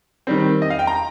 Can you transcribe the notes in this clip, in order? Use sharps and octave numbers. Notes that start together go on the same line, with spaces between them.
D#3 G3 C4
D#5
F5
G5
A#5